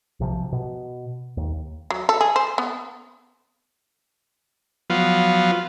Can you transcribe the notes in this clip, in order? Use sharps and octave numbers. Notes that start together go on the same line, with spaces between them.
B1 C3 F3
B2
D#2
F#3
A4
G#4
C5
B3
F3 F#3 B3 F4